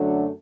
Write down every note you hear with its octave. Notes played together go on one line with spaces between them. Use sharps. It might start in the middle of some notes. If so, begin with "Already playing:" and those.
Already playing: F#2 D3 F#3 A3 D4